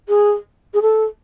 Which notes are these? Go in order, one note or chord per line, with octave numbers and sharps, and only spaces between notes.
G#4
G#4
A4